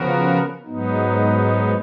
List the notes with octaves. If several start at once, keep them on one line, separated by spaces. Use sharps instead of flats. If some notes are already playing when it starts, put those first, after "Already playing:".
Already playing: C#3 F3 B3 F#4 A#4
G#2 F#3 B3 D#4